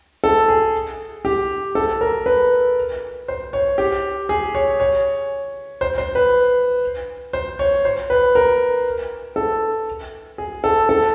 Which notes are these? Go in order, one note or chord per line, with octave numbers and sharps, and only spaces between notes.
A4
G#4
G4
A4
A#4
B4
C5
C#5
G4
G#4
C#5
C#5
C5
C5
B4
C5
C#5
C5
B4
A#4
A4
G#4
A4
A4